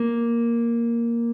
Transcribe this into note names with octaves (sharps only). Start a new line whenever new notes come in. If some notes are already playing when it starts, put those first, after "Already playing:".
Already playing: A#3